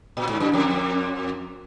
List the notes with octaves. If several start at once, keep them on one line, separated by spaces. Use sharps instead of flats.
A#2
G#2
F#2
F2